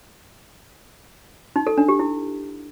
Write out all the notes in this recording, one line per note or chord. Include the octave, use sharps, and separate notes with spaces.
D#4
A4
D4
G4
E4